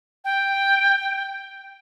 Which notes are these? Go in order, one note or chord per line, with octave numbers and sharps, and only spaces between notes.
G5